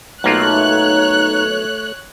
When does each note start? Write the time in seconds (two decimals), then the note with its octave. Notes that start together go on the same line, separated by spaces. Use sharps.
0.24 B1 A3 A#3 D#4 F4 C#5 F#6